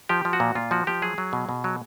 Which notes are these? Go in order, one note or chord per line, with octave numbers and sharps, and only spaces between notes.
F3 G4
F3
F#4
A#2
A#2 F4
F3 F#4
F3 G4
F#3 G#4
F#3
B2
B2
F#3